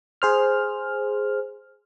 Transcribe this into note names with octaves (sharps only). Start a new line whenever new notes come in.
G#4 C5 F6